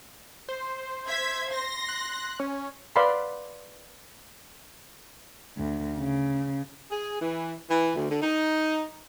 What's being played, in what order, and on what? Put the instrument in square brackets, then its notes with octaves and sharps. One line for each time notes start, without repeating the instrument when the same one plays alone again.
[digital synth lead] C5
[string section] E5 G#6 B6
C6 A#6
[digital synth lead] F#6
C#4
[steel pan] B4 D5 F5 F#5 B5 C6
[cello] D2
C#3
[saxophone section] G#4
E3
E3
D2
D3
D#4